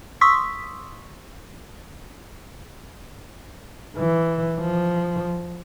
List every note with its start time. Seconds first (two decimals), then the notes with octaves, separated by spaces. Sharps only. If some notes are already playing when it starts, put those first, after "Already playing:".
0.21 C6 C#6 D#6 E6 B6
3.97 E3
4.60 F3